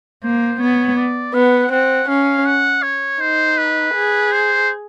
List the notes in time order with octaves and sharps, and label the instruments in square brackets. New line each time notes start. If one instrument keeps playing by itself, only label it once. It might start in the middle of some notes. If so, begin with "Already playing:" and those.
[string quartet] A#3 [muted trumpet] C5
[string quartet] B3 [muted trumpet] C#5
[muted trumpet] D5
[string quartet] B3 [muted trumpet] F#5
[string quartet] C4 [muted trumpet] F#5
[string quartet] C#4 [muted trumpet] F5
[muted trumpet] F#5
C#5
[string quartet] D#4 [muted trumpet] C5
[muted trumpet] B4
[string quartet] G#4
[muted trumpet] C5